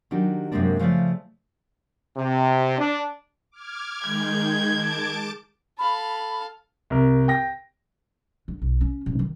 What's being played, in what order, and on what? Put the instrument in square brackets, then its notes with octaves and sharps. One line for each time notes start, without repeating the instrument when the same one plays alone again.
[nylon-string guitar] D#3 F#3 D4 G4
F#2 C3 F#3 G#3 A#3 D4
C#3 F3 G#3 A3 D5
[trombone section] C3
D4
[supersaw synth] D6 F6 G#6
[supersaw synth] D#3 G#3 G6 [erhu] G#6
[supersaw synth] A5 D6 D7
[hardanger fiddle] A4 F5 [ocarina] B5
[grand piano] C2 A#4
G5 A#6
[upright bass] D3
B1
C#4
A1
D#3